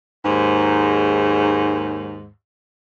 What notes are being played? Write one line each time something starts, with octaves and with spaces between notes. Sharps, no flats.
D#2 G#2